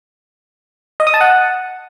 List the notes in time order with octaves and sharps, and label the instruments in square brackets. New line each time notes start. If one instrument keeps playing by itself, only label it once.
[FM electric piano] D#5
D#6
A5
F#5